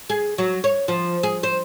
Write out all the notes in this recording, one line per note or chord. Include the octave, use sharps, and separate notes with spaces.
G#4
F#3
C#5
F3
G#4
C5